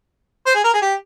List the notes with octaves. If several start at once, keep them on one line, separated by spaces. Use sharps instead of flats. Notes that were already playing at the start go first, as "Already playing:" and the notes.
C5
G#4
A#4
G#4
G4